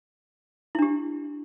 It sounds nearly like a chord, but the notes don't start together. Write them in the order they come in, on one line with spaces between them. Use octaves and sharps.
E4 D4 G4